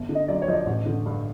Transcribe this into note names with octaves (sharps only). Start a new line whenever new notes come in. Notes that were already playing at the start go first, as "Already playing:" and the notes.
Already playing: G1
D3
D#5
F#2 D5
C#5
F3 D#5
D5
A1
D3
G2